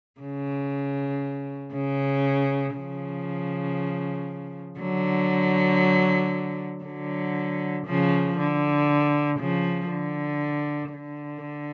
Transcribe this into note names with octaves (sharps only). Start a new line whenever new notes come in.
C#3
C#3
C#3 F3
D3 F#3
D3 F#3
C#3 F3
D3
C#3 F3
D3
D3